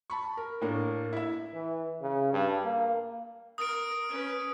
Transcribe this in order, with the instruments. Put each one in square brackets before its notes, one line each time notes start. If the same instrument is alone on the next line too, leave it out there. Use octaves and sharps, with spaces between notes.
[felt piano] A5 B5 C#6
A#4
A2 A#3 D4 A#4
E4 E5
[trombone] E3
C#3
G2
A#3
[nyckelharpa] A#4 A#5 [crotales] D#6 D7
[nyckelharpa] C#4 B4